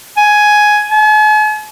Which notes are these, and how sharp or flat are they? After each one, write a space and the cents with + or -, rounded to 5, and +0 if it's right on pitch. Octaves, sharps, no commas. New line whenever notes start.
G#5 +10
G#5 +45